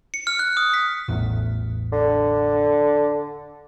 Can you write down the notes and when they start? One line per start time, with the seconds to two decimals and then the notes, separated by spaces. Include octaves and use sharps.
0.14 C#7
0.27 F6
0.39 F#6
0.57 D#6
0.74 B6
1.08 A1 E2
1.92 D3